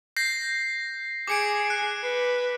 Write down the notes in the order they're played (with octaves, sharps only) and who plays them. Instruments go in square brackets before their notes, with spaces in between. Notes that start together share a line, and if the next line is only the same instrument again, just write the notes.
[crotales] G6 A#6 C7
[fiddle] G#4 [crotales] D6 C#7 D7
[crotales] F#6
[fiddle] B4